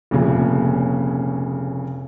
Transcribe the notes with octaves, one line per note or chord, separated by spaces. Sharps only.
F1 A#2 C#3